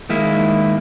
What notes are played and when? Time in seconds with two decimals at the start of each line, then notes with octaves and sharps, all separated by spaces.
0.09 D#3 G#3 A#3 E4